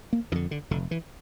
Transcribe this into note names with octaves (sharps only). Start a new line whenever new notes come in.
A#3
F2 D3 E3
D3
F1 D3
E3